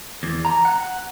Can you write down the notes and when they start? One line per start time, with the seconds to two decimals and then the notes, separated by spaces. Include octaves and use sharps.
0.23 E2
0.45 A#5
0.65 F#5